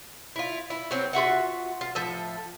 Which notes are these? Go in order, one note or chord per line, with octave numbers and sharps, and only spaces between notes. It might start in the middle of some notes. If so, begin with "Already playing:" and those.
E4 F4
E4
F#3 B3 C4
F4 F#4 E5 F#5
F4
A2 F3 A4 E5